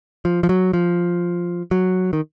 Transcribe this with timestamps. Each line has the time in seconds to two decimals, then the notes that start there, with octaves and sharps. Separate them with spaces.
0.25 F3
0.43 F3
0.49 F#3
0.73 F3
1.71 F#3
2.13 D#3